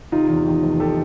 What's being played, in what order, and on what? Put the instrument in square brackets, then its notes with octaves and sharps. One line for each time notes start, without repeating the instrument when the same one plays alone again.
[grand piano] C3 D#4 F4
E2
D#3
F1
G4 A4